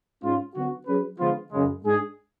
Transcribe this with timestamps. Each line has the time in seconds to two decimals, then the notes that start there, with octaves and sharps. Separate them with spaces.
0.23 G#2 G#3 C#4 F4
0.55 D3 F#3 B3 F#4
0.87 F#3 C#4 G#4 B4
1.19 D3 F3 G#3 B3 F4
1.52 F#2 C#3 G#3
1.84 G#2 G#3 D4 G#4